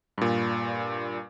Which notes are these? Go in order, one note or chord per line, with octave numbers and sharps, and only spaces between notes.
G2 A#2